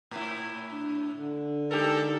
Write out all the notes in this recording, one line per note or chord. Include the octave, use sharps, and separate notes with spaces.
A2 E4
D4
D3
G#3 D#4 G4 A4 A#4